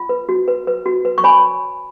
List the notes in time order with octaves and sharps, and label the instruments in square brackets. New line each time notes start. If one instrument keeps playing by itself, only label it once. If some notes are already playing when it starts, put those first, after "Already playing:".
Already playing: [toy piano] F4
B4
F#4
B4
B4
F#4
B4
C#6
C#5 G#5 B5